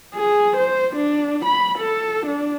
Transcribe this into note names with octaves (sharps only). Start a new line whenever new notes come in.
G#4
C5
D4
B5
A4
D4